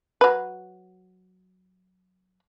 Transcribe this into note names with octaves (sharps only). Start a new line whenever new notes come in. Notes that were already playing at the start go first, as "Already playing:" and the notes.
F#3 B4